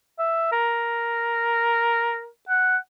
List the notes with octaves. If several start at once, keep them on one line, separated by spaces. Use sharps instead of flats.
E5
A#4
F#5